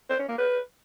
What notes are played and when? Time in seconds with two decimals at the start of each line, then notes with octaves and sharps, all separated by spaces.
0.10 C5
0.19 C#4
0.29 A#3
0.38 B4